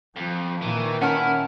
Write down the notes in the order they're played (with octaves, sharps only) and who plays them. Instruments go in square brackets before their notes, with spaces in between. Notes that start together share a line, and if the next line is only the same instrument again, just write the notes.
[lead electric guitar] F2 [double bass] F3
[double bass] A#2 D#3 [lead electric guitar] E3
[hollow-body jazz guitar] C#4 [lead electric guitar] E4 [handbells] F#5 A5 F6